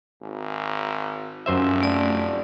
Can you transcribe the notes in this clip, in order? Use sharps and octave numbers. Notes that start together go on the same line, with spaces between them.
G#1
F1 F#2 C5 E5
A3 D5